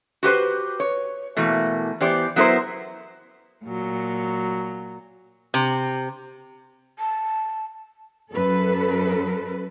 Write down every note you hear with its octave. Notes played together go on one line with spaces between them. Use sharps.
F#4 G4 B4 C5
C#5
B2 E3 A3 A#3
E3 B3 G4 C5 D5
F#3 B3 E4 A#4 C5
A#2 F#3
C3
A5
F#2 A4 B4